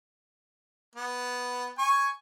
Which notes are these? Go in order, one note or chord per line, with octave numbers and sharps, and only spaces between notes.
B3
G#5 C#6